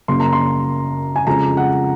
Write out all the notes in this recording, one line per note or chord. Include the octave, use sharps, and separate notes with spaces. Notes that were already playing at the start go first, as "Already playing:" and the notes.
F#2 C#3 F#3 A#3 C6
A#5
C6
G#5
F2 C#3 F3 G#3 A#5
F#5